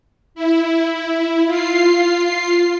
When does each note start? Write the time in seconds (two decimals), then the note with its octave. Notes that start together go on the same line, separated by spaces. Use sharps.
0.35 E4
1.46 F4 C7